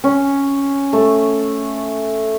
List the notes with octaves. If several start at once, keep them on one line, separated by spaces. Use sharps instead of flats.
C#4
A3